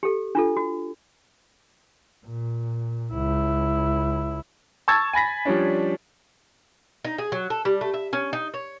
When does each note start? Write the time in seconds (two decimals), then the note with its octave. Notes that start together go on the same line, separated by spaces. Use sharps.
0.03 G4 A4
0.35 D4 F4 A4
0.57 F#4
2.26 A#2
3.13 C#2 E4
4.88 A5 C#6 E6 G#6 A6
5.13 G#5 B5 A#6 B6
5.45 F3 G3 C#4 D4
7.05 D#4
7.18 G#4
7.32 F#3
7.50 A4
7.65 G3
7.81 A3
7.94 E5
8.13 C#4
8.33 D#4
8.54 C#5